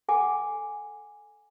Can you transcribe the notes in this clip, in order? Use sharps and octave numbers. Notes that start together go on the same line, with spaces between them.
A4 F#5 G#5 D6